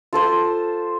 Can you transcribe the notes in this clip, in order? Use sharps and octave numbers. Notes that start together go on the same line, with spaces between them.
F4 A4 C5